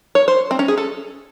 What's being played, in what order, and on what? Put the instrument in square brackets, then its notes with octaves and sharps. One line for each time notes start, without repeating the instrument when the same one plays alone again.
[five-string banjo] C#5
C5
C4
C#4
G#4
A4